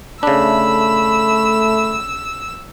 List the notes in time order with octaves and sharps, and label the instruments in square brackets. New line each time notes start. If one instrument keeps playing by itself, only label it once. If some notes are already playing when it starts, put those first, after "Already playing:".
[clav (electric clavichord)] C#3 D4 [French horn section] A3 [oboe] B5 [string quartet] E6